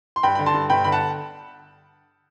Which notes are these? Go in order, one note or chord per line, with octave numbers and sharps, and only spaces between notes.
C6
G2 G5 B5
D3 B5
A5 C6
G2
G1 G5 B5
D3 B5
F#5 A5